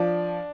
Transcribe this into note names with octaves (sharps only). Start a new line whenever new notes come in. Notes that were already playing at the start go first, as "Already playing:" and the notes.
Already playing: F3 D4 D5